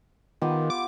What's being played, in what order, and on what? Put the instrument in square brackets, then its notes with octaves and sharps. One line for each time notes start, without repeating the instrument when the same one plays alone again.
[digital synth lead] D#3 [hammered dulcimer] B3 F4 G4
[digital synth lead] D6